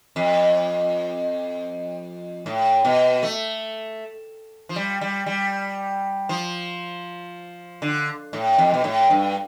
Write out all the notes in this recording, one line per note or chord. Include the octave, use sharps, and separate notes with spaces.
F2
A2
B2
A3
F3
G3
G3
G3
F3
D3
A2
F2
B2
A2
G2